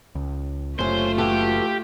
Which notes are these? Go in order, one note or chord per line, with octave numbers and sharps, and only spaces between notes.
C#2
F#1 C3 A3 C#4 F4 C5
E3 F#4 G4 A4